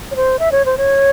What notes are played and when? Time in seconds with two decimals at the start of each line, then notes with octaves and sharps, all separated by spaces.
0.11 C#5
0.16 C5
0.39 E5
0.52 C#5
0.66 C5
0.78 C#5